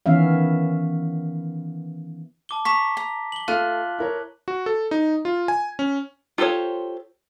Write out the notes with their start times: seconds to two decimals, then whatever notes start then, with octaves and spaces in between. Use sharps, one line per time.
0.06 D#3 E3 B3 C#4 E5 F5
2.49 A5 D6 G7
2.65 A5 A#5 C#6 B6
2.97 A#5
3.32 F#7 G7
3.48 A3 F4 E5 F#6 D#7
3.99 E4 A#4 C#5
4.48 F#4
4.66 A4
4.91 D#4
5.25 F4
5.48 G#5
5.79 C#4
6.38 F4 G4 A4 C5 C#5